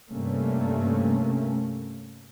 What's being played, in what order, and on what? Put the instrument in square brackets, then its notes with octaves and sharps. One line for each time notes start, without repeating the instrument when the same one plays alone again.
[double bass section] G2 C3 A3 A#3 C#4